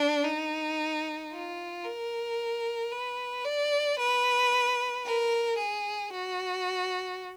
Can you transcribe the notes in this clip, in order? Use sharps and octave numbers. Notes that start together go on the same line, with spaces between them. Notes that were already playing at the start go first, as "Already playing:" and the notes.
Already playing: D4
D#4
F4
A#4
B4
D5
B4
A#4
G#4
F#4